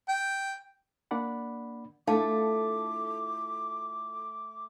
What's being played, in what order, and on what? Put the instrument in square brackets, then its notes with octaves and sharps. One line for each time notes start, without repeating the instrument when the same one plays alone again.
[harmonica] G5
[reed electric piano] A#3 D4 D5 F#5 B5
[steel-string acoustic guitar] A3 [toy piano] D4 F5 A5 [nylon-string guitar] E4 F4 A4 [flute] D6